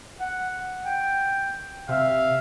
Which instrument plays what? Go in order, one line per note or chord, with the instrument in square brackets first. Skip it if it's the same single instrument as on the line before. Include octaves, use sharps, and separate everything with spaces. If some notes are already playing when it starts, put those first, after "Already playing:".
[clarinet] F#5
G5
[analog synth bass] C3 [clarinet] E5 [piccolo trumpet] F5